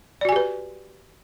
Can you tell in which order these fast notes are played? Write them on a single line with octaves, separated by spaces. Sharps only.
D5 F#4 G#5 G4 B4